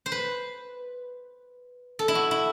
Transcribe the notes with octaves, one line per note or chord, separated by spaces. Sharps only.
C5
B4
A4
E4
F#4
E4